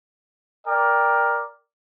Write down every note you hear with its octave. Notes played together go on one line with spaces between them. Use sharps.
A#4 D5 G5